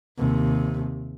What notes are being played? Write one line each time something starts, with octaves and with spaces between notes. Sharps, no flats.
D#2 C3